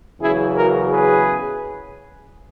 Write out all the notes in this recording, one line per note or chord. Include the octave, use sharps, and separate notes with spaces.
E2 C#3 F#3 E4 G#4
F#4 A#4
G#4 B4